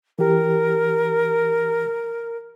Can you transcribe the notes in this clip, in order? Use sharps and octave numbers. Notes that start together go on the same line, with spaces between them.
E3 G4 A#4